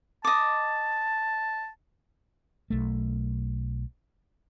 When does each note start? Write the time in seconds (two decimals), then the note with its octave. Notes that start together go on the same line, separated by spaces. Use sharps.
0.25 D#5 A5 D6
2.70 B1 A3